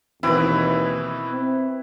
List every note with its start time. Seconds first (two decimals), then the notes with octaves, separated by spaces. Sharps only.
0.23 D#2 B2 E3 C4 E4 B4
1.32 C4